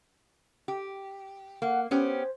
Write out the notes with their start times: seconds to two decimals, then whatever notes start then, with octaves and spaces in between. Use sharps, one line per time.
0.68 G4
1.62 A#3 F#5
1.91 B3 C#4 G4 C5